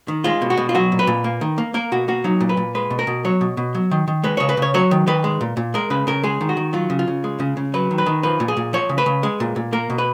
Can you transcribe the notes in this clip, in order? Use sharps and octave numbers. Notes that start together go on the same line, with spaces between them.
D#3
G#3 F4
B2
F#4
B2
F4
F#3 F#4
A#2
B4
A#2
A#3
D#3
A#3
A#3 A#4
B2 F#4
A#3 F#4
F#3 D#4
A#2
B4
A#2
G#3 B4
B2
A#4
B2
F#3 C#5
B2
B2
F#3
D#3
D#3
G#3 B4
C#3 C#5
B4
C#3 C#5
F#3 C#5
D#3
D#3 B4
G#3
A#2
A#2
G#3 A#4
C#3 B4
C#3 A#4
G#3 G#4
D#3
F#4
D#3
F#3 F4
C#3
F4
C#3
G#3
C#3
C#3
F#3 B4
D#3
B4
D#3
F3 B4
A#2
G#4
A#2
F3 C#5
C#3
B4
C#3
G#3
A#2
A#2
A#3 A#4
B2
B4